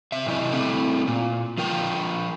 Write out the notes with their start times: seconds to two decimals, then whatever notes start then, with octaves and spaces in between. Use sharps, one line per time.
0.12 C3 E5
0.26 F#2 C3 E4 D#5
0.52 A3 C4 E4
1.07 A#2
1.58 F3 F4 A#4 G5